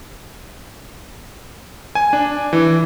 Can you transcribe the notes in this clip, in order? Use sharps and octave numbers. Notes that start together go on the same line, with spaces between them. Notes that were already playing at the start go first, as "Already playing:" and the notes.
G#5
D4
E3